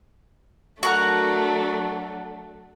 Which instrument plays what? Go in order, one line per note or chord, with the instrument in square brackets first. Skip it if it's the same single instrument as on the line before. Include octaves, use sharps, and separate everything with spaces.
[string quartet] F#3 A3 D4 [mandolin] F#4 A#4 F#5